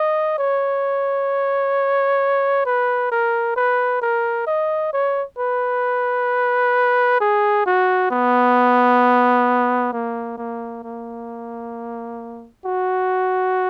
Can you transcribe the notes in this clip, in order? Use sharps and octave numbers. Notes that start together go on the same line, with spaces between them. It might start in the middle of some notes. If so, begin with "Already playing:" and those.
Already playing: D#5
C#5
B4
A#4
B4
A#4
D#5
C#5
B4
G#4
F#4
B3
A#3
A#3
A#3
F#4